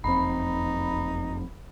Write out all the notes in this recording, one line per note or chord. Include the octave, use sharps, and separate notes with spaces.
F#1 F2 C4 D#4 B5